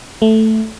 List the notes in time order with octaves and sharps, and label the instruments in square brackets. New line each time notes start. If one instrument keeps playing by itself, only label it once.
[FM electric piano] A3